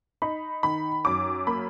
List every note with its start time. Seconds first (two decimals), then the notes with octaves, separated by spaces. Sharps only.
0.22 D#4 B5
0.63 D#3 B5
1.05 F#2 D6
1.47 A#3 B5